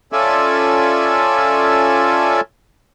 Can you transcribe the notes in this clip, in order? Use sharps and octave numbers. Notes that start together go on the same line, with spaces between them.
C#4 F4 A4 D5 E5 G#5